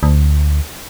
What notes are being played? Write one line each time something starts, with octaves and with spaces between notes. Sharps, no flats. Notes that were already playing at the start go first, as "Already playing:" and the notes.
D2